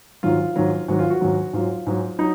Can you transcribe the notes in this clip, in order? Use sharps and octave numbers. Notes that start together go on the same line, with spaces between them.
G#2 D#3 F#3 F4
G#2 D#3 F#3
G#2 D#3 F#3 F#4
F4
F#4
G#2 D#3 F#3
G#2 F#3 F4
G#2 F#3
F#3 D#4